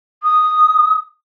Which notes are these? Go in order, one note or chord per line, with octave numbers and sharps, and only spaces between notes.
D#6